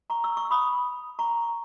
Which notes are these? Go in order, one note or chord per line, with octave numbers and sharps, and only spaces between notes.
A#5 C#6
C#6 E6
C#6 E6
B5 D#6
A#5 C#6